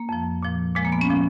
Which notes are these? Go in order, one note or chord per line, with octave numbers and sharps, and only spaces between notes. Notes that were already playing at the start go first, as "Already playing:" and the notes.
Already playing: A#3
F2 F3
A#2 F3
A#2 F3 G#3
A#3
B3
C#4
A#2 F3